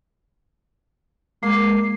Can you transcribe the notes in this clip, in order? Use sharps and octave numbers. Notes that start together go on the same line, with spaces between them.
G#3 A#3 C7